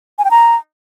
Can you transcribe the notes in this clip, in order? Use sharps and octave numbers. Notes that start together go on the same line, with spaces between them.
G#5
G5
A#5